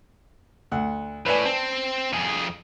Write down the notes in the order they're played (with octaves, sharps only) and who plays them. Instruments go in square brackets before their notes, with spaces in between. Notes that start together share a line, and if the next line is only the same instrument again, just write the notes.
[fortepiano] D2 F#5
[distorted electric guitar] A2 [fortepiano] B4 D5 G#5
[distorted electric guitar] C4 [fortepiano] A5
[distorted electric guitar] F2 G#4